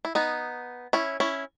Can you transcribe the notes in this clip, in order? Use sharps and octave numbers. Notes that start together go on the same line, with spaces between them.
E4
B3 D#4
C#4 E4
C#4 E4